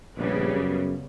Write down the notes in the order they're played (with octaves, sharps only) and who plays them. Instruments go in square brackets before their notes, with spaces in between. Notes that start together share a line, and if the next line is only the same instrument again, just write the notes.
[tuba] A#1 [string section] C#3 G3 B3
[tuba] F#2